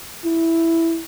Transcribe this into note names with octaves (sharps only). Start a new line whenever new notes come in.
E4